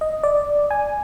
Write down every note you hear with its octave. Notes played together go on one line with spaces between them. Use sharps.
D#5
D5
G#5